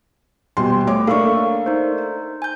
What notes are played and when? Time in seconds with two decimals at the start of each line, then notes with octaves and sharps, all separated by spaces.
0.57 D#1 B2 C6
0.87 A3 C#5 D6
1.07 A3 A#3 D4 F5 C#6
1.66 D#4 C5
2.42 G#5 G6